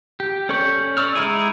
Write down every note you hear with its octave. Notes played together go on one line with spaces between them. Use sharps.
G4
C#4 A4 D5 C#6 G6
D5 C#6 E6 F6
G#3 D#4 E4 G#4